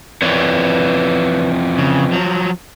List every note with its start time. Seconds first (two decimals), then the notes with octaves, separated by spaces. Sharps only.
0.22 F2 E3 B4 C#5 D5
1.78 C#3
2.13 F3 F#3